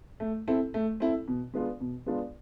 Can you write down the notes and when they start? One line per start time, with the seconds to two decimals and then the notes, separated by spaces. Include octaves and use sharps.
0.20 A3
0.48 C4 E4 A4
0.74 A3
1.00 C4 E4 A4
1.28 B2
1.54 G#3 B3 D4 F4
1.81 B2
2.06 G#3 B3 D4 F4